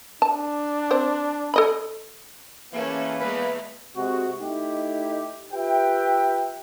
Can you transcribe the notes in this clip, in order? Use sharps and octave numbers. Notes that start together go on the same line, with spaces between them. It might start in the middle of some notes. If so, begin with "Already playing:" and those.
D4 A5
C4 C5
A4 D#5 B5
E3 A3 A#3 C#4 G#4
E2 G#3 A3 B4
C3 G#3 F#4
A3 D#4 E4 G4
F4 G4 B4 E5 G5